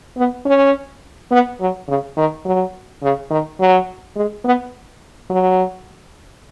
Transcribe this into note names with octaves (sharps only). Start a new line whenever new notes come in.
B3
C#4
B3
F#3
C#3
D#3
F#3
C#3
D#3
F#3
G#3
B3
F#3